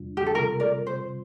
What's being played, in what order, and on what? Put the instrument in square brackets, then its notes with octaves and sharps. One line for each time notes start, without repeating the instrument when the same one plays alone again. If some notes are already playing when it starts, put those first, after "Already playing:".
Already playing: [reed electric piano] E2 C3 G3 D4 F4
[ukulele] G4
A4
[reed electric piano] C3 G3 C4 F4 [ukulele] A#4
[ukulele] A#4 D5
C5